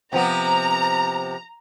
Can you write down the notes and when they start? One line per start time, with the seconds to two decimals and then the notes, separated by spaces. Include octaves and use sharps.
0.13 C3 F3 B3 A#5